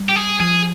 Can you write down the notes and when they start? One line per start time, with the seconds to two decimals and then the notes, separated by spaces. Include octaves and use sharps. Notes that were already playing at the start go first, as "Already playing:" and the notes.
Already playing: G3
0.09 G4
0.16 G#4
0.40 F3 G#4